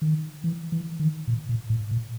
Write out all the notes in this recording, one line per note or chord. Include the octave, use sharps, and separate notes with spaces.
D#3
E3
E3
D#3
A#2
A#2
A2
A#2